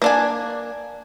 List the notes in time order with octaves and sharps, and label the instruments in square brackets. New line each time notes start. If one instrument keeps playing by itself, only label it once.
[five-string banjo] A#3 D4 G#5